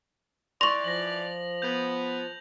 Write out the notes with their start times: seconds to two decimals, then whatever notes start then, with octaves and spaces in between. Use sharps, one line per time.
0.61 E3 D5 C6 C#6 A#6 F7
0.84 F3 A#6 F#7
1.62 B3 G6 F7